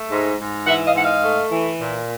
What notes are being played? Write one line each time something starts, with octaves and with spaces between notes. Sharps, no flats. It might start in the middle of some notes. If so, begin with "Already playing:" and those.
Already playing: A3
G#2
G#2
E3 E5 F#5
D#5 F5
G#2 F#5
D#5 F5
A3
E3
A#2